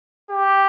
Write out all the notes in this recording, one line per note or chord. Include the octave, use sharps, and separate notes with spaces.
G4